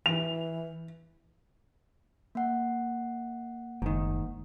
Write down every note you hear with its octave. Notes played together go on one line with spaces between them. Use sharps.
E3 F7
A#3 F#5
F#1 G#2 D#3